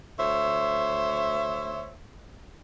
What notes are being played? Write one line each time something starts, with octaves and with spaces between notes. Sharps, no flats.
D2 C5 C#5 E5